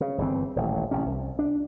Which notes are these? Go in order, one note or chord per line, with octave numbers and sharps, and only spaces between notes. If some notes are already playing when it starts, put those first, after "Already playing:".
C#3
G1 C#3 E3 C4
D#1 A1
A1 C3 C#4
C2
D4